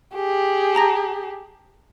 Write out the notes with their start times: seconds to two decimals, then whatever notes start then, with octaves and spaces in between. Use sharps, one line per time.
0.15 G4 G#4
0.75 A5 A#5 A#6